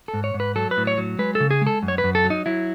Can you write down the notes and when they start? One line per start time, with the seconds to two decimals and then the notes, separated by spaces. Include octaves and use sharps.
0.08 A4
0.14 G#2
0.24 C#5
0.34 G#2
0.40 B4
0.56 F#3 A4
0.71 B4
0.77 A2
0.87 C#5
0.98 F#3
1.19 G#3 B4
1.35 A4
1.40 C#3
1.51 G#4
1.62 G#3
1.67 A4
1.83 F#2
1.88 C#5
1.98 B4
2.04 F#2
2.15 A4
2.25 F#3
2.30 D#4
2.46 F#3 E4